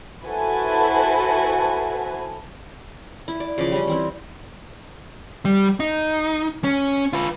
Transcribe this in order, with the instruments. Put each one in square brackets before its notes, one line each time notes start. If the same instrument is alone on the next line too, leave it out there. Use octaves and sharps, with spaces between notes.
[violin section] E4 F#4 A4 B4 C5 G#5
[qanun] E4
D5
C#3 F3 D6
G3 C#4
E3 C4 E4
[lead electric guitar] G3
D#4
C#4
F4 B4